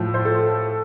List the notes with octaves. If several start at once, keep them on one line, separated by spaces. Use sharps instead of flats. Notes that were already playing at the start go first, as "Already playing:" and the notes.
Already playing: A2 F3
C5
A4